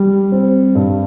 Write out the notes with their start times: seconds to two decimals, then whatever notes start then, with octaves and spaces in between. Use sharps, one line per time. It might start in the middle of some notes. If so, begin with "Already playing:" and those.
Already playing: G3
0.32 C4
0.75 G2